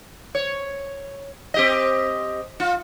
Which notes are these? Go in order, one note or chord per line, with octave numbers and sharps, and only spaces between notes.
C#5
C4 G4 D#5
F4